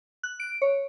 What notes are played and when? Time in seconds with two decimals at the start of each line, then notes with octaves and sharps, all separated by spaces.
0.23 F#6
0.40 D7
0.62 C#5